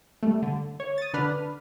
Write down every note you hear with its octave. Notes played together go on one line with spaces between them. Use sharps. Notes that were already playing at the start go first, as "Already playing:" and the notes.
G3 A3
D3
C#5
D#6 A6
D3 D4 B4 F6